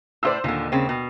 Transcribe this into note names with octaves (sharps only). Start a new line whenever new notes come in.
A2 F4 C5 D5 E6
D#2 A#2 D3
C#3 C4
B2